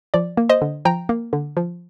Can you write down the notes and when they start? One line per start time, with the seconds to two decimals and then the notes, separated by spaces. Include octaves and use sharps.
0.14 F3 D5
0.37 A#3
0.49 C5 D#5
0.62 D3
0.85 F3 G5 A#5
1.09 A#3
1.33 D3
1.57 F3